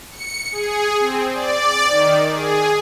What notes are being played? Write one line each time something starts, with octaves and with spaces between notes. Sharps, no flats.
C#7
G#4
C4
D5
D#3
G#4